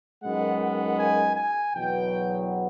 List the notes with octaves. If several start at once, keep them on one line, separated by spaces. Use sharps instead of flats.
F#2 D#3 G#3 B3 F#5
F#5
G#5
G#5
E2 B2 F#3 B3 G5